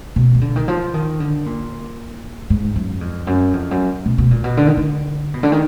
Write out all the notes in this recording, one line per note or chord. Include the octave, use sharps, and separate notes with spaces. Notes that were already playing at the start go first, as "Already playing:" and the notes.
B2
D#3
D3
D#3
F3
D#3
D3
A#2
G#2
F#2
F2
F#2
F2
F#2
B2
B2
A#2
B2
D3
D#3
D3
B2
D3
D#3